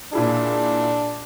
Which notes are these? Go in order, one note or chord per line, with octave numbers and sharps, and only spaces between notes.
A#2 D4 E4 G#4